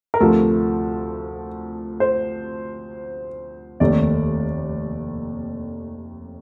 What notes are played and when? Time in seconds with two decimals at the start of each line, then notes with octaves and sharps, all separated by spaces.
0.14 A#4
0.20 D2 C3 F3 A3 A4
2.00 C5
3.80 F1 D#2 D#3 A3 D5